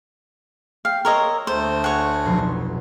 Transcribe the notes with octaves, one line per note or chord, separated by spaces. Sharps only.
F5 G5
A#4 C#5 D#5 C6 E6
D2 A3 C5
C#5 F#5 G#5
F1 B1 C6